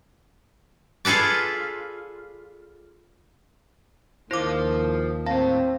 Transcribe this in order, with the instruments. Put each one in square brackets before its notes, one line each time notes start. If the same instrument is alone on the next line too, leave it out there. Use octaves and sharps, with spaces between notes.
[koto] F4 G#4 A4 B4 D5
[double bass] D#2 D#3 [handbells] E4 D6 [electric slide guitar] F4 C5
[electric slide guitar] A2 A5 [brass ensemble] C4 [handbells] F5